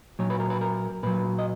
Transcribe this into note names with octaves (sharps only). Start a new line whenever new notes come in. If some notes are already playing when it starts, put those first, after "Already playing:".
A#2 F#3 C#5
B4
A#4
B4
A#4
A#2 F#3 B4
D#5